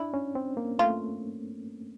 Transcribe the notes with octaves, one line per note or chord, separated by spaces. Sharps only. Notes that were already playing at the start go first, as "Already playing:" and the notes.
Already playing: D4 E4
C#4
C4
A#3
A3 F4